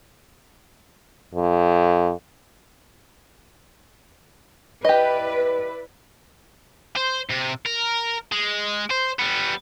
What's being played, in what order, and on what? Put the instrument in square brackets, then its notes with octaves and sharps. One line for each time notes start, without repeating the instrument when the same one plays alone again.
[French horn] F2
[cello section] E4 B4 D5 [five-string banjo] G4 D#5
[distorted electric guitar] C5
C3
A#4
G#3
C5
G3 B3